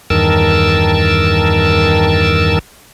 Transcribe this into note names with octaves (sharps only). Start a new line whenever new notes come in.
E2 G2 D#3 A#4 A5 E6